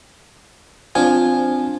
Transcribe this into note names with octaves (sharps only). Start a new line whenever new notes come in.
F3 C4 D4 F4 G#5